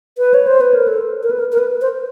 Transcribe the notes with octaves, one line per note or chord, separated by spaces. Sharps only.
B4
C#5
C5
B4
A#4
A4
A#4
B4
A#4
A#4
B4
C5